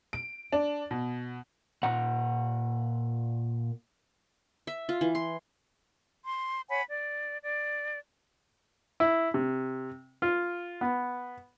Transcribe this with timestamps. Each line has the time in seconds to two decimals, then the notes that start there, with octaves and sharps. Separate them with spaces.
0.13 D7
0.53 D4
0.91 B2
1.83 A#2 F#5 A#5
4.67 E5
4.89 F4
5.01 E3
5.15 C6
6.25 C6
6.69 C#5 F#5 G#5 B5
6.89 D5
7.42 D5
9.00 E4
9.34 C3
10.22 F4
10.81 B3